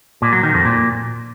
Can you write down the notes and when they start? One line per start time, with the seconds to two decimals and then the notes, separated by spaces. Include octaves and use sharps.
0.22 A#2
0.33 F#3
0.43 D#3
0.54 F2
0.65 A#2